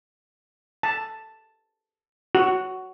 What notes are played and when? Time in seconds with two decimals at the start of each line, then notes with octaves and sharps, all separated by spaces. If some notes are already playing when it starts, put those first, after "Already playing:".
0.83 A5
2.35 F#4